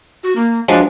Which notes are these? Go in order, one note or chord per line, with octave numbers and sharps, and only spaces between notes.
F#4
A#3
F3 F#3 G#3 D4